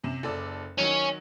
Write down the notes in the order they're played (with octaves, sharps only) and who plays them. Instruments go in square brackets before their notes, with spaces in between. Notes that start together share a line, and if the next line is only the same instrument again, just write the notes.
[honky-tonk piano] F#2 C3 E7
F#1 A4 D5
[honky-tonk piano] D#3 F#3 [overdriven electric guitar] C#4